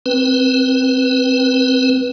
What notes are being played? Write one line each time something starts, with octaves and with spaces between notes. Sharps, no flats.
C4 B4